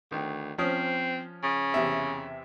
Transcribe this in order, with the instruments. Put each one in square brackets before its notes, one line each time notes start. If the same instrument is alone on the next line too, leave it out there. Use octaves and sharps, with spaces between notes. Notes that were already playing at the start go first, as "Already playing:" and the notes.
[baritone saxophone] D2 [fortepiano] D#3
[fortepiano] F3 C#4 D#6 [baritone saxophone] C4
[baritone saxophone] C#3
[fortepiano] E2 C3 E5